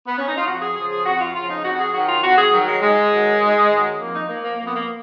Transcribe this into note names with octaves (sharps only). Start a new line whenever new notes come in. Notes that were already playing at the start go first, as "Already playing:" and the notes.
B3
C#4
D#4
F4
F2 F#4
G#4
C#3 F3 G#4
G#4
F2 F#4
F4
C#3 F3 F4
D#4
F2 F#4
F#4
G#4
D#3 F#3 F#4
F4
F2 F#4
G#4
D#3 F#3
G#3
G#2 G#3
D#3 F#3
G#2
D#3 F#3
F2 A#3
D#4
F3 A#3
A#3
F2 A#3
B3
A#3